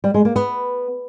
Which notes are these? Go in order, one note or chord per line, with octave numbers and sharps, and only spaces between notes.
G3
G#3
A#3
B3